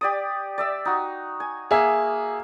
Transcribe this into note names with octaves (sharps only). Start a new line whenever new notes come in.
G4 D5 D#6
D5 E5 E6
D#4 F#4
G#5
A#3 G#4 E5